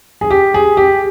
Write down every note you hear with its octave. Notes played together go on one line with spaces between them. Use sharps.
G#4
G4
G#4
G4